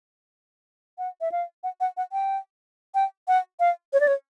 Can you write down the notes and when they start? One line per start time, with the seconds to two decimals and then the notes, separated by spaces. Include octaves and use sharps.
0.98 F#5
1.21 E5
1.32 F5
1.64 F#5
1.80 F#5
1.97 F#5
2.12 G5
2.95 G5
3.28 F#5
3.60 F5
3.93 C#5
4.00 D5
4.07 C#5